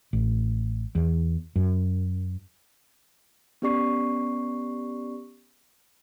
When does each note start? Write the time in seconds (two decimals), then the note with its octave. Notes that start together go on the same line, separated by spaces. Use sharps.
0.13 A1
0.95 E2
1.56 F#2
3.62 B3 C#4 G4 D5 C#6 C7